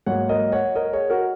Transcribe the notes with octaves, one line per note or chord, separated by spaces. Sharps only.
G#2 F#3 A#3 C#5 F#5
A#4 D#5
C#5 F#5
A#4 D#5
G#4 C#5
F#4 A#4